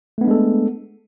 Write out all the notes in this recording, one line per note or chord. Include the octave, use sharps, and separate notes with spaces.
G#3 A3 B3 D4 A4